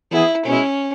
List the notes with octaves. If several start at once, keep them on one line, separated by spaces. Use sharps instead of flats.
E3 B3 E4 G#4
B2 G#3 C#4 E4